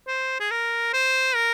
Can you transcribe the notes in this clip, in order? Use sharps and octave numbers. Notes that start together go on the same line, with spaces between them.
C5
G#4
A#4
C5
A#4